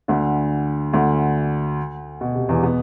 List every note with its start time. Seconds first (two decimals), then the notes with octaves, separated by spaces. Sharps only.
0.08 D2 D3
0.93 D2 D3
2.21 B2
2.35 C3
2.49 E2 E3
2.63 B2 B3